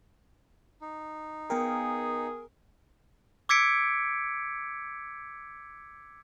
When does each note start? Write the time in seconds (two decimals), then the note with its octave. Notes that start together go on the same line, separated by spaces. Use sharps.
0.81 D#4
1.50 B3 G#4 A#4 G5 G#5
3.49 D6 E6 G#6 B6 C#7 D7